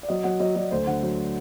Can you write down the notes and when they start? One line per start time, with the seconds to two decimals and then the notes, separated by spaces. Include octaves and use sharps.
0.03 D5
0.09 F#3 D#5
0.24 F#3 F#5
0.40 F#3 D#5
0.56 F#3 D5
0.71 D2 C5
0.87 D3 F#5
1.03 F#3